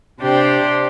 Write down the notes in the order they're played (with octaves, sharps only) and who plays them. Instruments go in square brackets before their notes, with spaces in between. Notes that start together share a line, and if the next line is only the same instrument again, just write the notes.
[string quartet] C3 D4 G4 C5